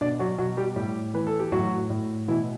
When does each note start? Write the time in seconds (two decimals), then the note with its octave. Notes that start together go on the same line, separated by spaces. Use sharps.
0.01 B2 D4 D5
0.19 F#3 F#4
0.38 B2 F#3 F#4
0.57 G3 G4
0.76 A2 G3 G4
1.14 E3 B4
1.27 A4
1.40 G4
1.52 A2 F#3 F#4
1.90 A2
2.28 B2 E3 E4